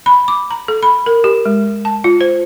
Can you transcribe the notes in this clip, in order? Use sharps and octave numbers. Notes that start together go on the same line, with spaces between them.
B5
D6
A#5
A4
B5
A#4
G4
G#3
A5
F4
C5